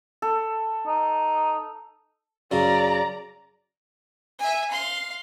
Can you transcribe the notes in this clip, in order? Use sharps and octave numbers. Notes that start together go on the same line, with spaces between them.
A4
D#4
F#2 C#3 D5 A#5
E5 G#5
F5 C6